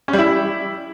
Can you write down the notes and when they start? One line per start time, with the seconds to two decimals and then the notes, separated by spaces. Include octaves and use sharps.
0.08 C#4
0.13 G3
0.18 E4